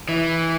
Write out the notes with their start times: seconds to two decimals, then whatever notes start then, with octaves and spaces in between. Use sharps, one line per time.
0.09 E3